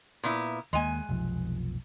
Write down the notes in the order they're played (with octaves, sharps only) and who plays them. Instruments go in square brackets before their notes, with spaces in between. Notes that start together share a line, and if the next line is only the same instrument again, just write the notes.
[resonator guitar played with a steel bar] A#2 B3 E4
[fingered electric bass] D#2 A#3 [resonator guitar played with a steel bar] G#3 G#5
[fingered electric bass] F1 B1 F3